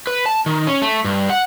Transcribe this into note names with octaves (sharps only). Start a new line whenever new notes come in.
B4
A5
D#3
C#4
A3
G2
F#5